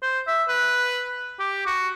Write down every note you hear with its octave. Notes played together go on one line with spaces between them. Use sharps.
C5
E5
B4
G4
F#4